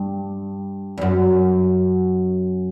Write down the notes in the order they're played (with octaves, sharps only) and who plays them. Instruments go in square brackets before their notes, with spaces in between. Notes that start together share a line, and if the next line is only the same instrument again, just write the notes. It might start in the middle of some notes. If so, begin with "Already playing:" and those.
Already playing: [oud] G2
E2
F#2